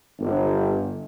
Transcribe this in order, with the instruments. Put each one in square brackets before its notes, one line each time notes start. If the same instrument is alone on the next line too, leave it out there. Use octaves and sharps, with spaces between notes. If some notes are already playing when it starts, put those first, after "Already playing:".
[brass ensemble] G1